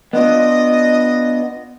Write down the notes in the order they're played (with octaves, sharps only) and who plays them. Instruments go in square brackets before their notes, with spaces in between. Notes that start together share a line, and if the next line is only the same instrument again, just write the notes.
[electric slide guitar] B3 D4 F4 [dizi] D#5